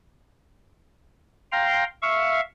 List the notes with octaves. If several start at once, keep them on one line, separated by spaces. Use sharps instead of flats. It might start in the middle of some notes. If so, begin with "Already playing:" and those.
F5 G5 A#5 C6
E5 F5 C#6